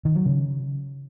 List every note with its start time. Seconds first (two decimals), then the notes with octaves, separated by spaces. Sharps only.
0.05 D#3
0.15 F#3
0.26 C#3